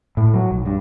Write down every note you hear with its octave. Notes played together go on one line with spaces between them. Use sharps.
A2
F#3
B1
G2